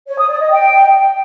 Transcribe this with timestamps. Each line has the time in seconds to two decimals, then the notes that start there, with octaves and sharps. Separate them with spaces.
0.08 C#5
0.19 D#6
0.30 D5
0.40 D#5
0.51 G5